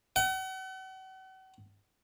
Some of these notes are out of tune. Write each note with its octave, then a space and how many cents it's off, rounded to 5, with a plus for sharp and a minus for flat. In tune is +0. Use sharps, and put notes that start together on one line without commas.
F#5 +40